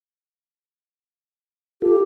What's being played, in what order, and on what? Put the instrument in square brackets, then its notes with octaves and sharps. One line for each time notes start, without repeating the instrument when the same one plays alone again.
[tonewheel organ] F4 A4 [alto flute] G4